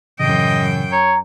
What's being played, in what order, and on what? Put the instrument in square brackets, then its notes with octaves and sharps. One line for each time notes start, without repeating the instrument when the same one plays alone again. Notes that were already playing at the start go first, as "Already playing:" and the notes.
[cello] F#2 G5 [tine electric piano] A2 C#3 E3 [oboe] D#5
[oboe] C#5 [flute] A#5